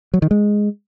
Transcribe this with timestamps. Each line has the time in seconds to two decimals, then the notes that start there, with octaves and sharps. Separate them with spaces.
0.14 F#3
0.22 D#3
0.31 G#3